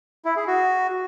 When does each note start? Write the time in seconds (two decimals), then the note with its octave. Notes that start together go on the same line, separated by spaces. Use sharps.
0.25 E4
0.36 G#4
0.47 F#4